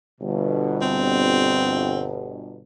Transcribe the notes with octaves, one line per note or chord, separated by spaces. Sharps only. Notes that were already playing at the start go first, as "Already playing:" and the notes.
G1 B2
C4